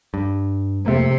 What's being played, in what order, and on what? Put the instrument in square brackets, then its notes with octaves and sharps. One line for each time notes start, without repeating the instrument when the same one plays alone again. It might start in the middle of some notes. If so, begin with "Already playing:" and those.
[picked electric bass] G2
[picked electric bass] F2 A3 A#3 [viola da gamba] C3